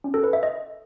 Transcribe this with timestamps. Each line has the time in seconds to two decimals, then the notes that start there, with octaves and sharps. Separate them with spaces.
0.04 C#4
0.14 A4
0.24 B4
0.33 E5
0.43 D#5